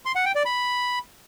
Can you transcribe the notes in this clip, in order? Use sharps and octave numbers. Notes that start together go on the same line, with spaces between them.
C6
F#5
G5
D5
B5